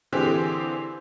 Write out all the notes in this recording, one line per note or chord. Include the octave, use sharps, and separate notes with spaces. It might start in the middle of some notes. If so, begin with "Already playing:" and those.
D3 E3 C4 G4 G#4